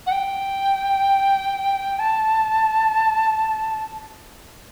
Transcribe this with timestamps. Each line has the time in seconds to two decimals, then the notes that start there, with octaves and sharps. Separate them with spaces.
0.07 F#5
0.12 G5
1.99 A5